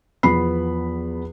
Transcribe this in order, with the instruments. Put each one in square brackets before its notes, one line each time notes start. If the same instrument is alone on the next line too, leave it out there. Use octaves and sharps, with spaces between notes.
[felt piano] E2 F3 B3 B5 C7